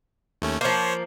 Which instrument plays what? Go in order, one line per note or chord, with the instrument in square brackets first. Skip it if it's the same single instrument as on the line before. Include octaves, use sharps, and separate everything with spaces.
[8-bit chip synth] D#2 A3 C#4
[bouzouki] F3 A#3 [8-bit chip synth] C5 C#5